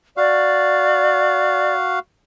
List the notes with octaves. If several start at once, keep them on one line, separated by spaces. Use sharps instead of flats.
F#4 D5 F5